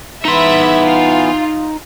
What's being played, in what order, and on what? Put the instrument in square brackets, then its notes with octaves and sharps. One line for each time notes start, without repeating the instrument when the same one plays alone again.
[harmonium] E3 B3 [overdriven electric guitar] D#4 C6 [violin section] E5 B5
[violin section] F4